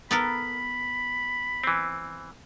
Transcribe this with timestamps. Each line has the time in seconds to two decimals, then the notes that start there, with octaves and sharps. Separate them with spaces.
0.11 B3 A4 A#4 B5
1.64 E3 C4